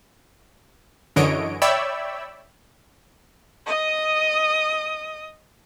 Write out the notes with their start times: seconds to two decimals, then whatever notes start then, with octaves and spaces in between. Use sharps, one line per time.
1.16 F#2 D3 E3 C#5 D#5 D7
1.62 C#5 D5 E5 G5 B5 E6
3.67 D#5 D#6